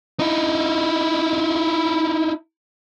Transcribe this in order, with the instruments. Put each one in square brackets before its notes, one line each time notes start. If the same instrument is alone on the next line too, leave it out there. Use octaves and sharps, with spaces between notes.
[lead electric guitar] D#4 E4